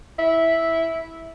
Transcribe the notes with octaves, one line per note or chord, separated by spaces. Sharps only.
E4